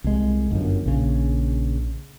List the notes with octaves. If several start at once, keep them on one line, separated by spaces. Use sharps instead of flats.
C2 G#3
G1 F#2
A#1 C#3